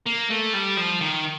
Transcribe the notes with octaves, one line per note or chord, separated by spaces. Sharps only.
A#3
A3
G3
F3
D#3